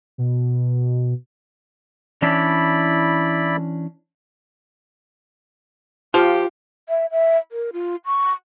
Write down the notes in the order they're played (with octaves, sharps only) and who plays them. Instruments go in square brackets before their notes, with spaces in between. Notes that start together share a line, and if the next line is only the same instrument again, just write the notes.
[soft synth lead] B2
[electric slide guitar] E3 C#4 D4 [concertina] E4 D5 B5
[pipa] F3 [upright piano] F4 [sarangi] G4
[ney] E5
E5
A#4
F4
C#6